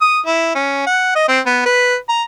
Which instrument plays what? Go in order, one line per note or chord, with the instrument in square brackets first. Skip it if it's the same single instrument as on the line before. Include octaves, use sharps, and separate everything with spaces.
[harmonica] D#6
E4
C#4
F#5
D#5
C4
B3
B4
A#5